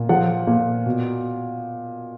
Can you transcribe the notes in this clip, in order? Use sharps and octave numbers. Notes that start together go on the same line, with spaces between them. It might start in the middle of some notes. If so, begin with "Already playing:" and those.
Already playing: A#2
F3 F#5
A#2
B2